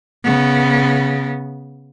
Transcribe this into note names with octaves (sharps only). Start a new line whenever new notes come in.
C#3 B3